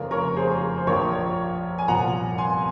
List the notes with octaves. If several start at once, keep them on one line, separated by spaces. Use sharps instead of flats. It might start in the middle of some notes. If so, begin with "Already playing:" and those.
Already playing: F1 F2 C#3 F3 A#4
A#4 C#5
G#4 C5
C5
A#1 A#2 F3 A#4 C#5
G#5
C2 A#2 F3 F#5 A#5
G#5 C6